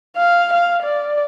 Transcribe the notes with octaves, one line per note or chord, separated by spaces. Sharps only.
F5
F5
D5